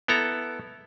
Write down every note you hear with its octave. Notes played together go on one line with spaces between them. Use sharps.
B3 E4 A4 A#5